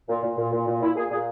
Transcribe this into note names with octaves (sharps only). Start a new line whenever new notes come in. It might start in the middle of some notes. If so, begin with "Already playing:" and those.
A#2
A#2
A#2
A#2
A#2
A#2 E4
A#2 G#4
A#2 G#4